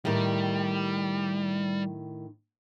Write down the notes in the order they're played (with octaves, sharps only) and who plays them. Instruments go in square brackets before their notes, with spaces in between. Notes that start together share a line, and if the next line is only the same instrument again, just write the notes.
[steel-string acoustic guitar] A2 D#3 [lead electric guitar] G3